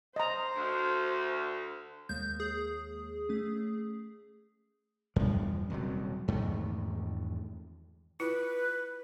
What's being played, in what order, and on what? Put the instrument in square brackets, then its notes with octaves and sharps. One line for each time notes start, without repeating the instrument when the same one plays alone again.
[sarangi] C5 [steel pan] D#5 A#5
[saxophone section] D2
[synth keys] D#2 G#3 A#3 [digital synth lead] G6
[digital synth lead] G#4
[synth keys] A3 C#4
[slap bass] E2 G2 F3
D#1 C3 F#3
E2 G#2 D#3 A3
[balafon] E4 F4 [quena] B4